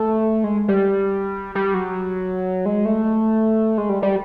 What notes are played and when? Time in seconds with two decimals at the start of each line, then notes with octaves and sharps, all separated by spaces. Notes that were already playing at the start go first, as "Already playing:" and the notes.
Already playing: A3
0.44 G#3
0.68 G3
1.55 G3
1.74 F#3
2.66 G#3
2.85 A3
3.78 G#3
3.89 G3
4.02 G3